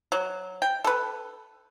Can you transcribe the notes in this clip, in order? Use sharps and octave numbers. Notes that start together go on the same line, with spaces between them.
F#3
G5
A4 B4